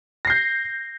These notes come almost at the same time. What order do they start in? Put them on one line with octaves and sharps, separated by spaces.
A#6 C7 G6